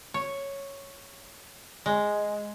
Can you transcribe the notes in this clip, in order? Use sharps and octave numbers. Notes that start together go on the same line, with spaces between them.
C#5
G#3